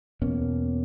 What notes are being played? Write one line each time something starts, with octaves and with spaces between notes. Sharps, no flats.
E2 B2 A#3 C#4